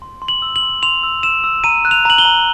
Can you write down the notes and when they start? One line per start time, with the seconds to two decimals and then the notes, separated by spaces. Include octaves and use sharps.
0.02 C6
0.22 C6
0.28 F#7
0.42 E6
0.56 F#7
0.63 C6
0.83 C6 F7
1.03 E6
1.23 E6 E7
1.44 E6
1.64 A#5 D#7
1.85 F#6
1.91 F7
2.05 A#5 F#7
2.18 G7
2.25 A#5